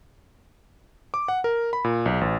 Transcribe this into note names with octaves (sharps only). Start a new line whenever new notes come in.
D6
F#5
A#4
B5
A#2
B1
A1